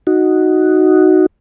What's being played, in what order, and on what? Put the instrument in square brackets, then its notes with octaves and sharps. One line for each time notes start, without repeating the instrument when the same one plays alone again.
[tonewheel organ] D#4 F#4